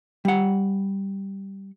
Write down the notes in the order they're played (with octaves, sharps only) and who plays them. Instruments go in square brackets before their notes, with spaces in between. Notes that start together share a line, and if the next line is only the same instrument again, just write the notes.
[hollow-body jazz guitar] G3 F#5